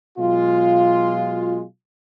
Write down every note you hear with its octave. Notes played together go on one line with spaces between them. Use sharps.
B2 F#3 G#3 F4